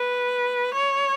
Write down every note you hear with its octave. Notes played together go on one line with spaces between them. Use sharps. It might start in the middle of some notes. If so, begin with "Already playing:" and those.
Already playing: B4
C#5